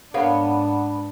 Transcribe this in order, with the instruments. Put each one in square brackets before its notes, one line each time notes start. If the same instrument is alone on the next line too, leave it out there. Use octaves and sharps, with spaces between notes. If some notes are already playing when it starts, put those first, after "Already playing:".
[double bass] G#2 D4 [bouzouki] B3 [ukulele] A#4 C#5 F5